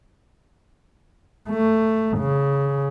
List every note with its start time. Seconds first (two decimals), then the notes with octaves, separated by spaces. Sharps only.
1.49 A3
2.18 C#3